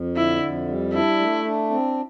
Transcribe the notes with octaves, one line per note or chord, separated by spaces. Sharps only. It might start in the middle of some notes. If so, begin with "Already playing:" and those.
Already playing: F2
D3 E4
F2
G3
D4 E4
A3
D4
C4